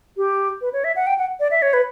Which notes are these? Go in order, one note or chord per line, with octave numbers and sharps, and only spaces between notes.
G4
B4
C#5
E5
F#5
G5
F#5
D5
E5
C#5
B4